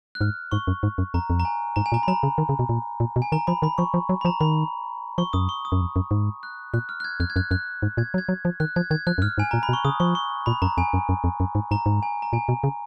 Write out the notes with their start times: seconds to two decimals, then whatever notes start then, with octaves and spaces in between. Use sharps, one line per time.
0.15 F#6
0.21 G#2 F6
0.51 G#2 C#6
0.68 F#2
0.83 G#2
0.98 F#2
1.14 F2 A#5
1.30 F2
1.40 A#5
1.45 G#5
1.76 G#2 A#5
1.86 G#5
1.92 A#2 A#5
2.03 B5
2.08 F#3 A#5
2.23 C#3
2.38 D#3
2.49 C#3
2.59 B2
2.69 A#2
3.00 A#2
3.16 B2
3.22 G#5
3.32 D#3 A#5
3.47 F3 B5
3.62 D#3 B5
3.78 F3 C#6
3.94 F3
4.09 F#3
4.21 B5
4.25 F3 A#5
4.41 D#3 B5
5.18 F3 C#6
5.33 F#2 D#6
5.49 C#6
5.65 D#6
5.72 F#2
5.81 F2
5.96 F#2
6.11 G#2
6.43 F#6
6.74 A#2 F#6
6.89 F6
7.00 F#6
7.04 G#6
7.20 F2 F#6
7.30 G#6
7.36 F#2 F#6
7.51 F#2 F#6
7.83 G#2
7.97 A#2 G#6
8.14 F#3
8.18 G#6
8.29 F#3
8.45 F3
8.60 D#3 F#6
8.76 F3 G#6
8.91 D#3 G#6
9.07 F3 F#6
9.18 F#2
9.22 G#2 F6
9.38 G#2 G#5
9.51 A#2 A#5
9.63 B5
9.69 B2
9.73 C#6
9.85 C#3 D#6
10.00 F3 C#6
10.15 C#6
10.46 A#2 B5
10.62 F#2 A#5
10.77 F2 G#5
10.94 F#2
11.09 F#2
11.24 F2
11.40 F#2
11.55 G#2
11.71 G#2 A#5
11.86 G#2
12.03 G#5
12.22 A#5
12.33 A#2 G#5
12.49 B2
12.64 C#3